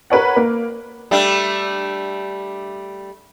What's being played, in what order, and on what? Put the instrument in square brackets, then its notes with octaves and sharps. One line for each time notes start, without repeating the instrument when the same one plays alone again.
[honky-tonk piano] A#4 B4 C#5 F#5
A#3
[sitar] G3 A3 D4